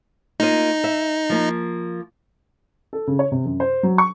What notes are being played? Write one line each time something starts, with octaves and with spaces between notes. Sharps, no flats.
A#3 D#4 F4 D#5
E5
F3 A#3
A4
C#3
C#5
C3
F#2
C5
F#3
C#6